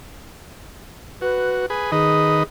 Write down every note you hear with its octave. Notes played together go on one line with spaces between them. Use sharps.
F#4 B4
G#4 B4
D#3 G#4 B4 D#5